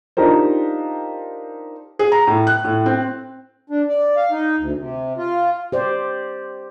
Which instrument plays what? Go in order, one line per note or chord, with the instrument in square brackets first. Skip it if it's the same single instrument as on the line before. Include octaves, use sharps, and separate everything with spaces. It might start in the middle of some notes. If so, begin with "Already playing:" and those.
[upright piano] D4 D#4 F4 G4 A#4 C5
[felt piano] G#4
A#5
A2
F#6
A2
C4
[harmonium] D4
D5
F5
D#4
D2
C3
F4
[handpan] G4 C5 D5